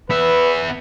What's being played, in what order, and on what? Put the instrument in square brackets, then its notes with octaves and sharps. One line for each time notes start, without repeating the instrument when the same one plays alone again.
[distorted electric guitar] B3 E5 [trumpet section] B4